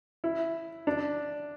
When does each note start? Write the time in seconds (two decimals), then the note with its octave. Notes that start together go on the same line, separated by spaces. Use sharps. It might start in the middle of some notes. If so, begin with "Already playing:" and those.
0.24 E4
0.87 D4